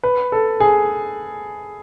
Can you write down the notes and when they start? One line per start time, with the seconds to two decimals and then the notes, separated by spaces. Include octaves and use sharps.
0.03 B4
0.32 A4
0.60 G#4